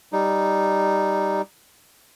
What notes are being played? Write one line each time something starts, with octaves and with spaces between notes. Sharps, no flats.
G3 D#4